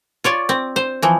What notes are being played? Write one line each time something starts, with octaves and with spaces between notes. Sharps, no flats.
F4 C#5 D5
C4
C5
E3 F3